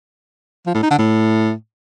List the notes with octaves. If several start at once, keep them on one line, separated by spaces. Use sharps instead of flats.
F3
A2
D#4
D3
A2